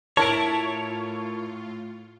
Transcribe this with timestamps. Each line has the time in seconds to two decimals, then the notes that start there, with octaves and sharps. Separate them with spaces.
0.17 A2 E4 F4 A#4 C#5 A5 D7